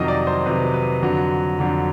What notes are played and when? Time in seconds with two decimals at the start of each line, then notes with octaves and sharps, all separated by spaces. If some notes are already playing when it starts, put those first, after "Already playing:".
Already playing: F2 C3 D#3 F#3 D#5
0.08 D5
0.27 C5
0.46 F2 C3 D#3 F#3 B4
0.74 B4
1.02 F2 D3 F#3
1.59 F2 D3 F#3